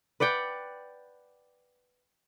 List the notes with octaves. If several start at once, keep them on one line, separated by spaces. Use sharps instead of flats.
B4 D5 F#5 G5